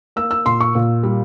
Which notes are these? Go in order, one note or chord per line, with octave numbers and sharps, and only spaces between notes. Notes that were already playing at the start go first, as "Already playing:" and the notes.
A#3 E6
E6
A#2 C6
C#6
A#2
G3